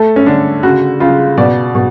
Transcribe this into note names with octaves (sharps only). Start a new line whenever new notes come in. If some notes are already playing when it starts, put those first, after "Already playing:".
Already playing: A3 A4
C#4
D3 D4
C#3 F#4
C#3 F4
B2 D5
B2